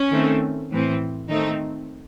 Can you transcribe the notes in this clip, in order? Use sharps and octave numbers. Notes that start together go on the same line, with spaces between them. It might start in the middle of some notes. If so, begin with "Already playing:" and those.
Already playing: C#4
D#3 A3 C4
A2 E3 C4
D#3 A3 C4 D#4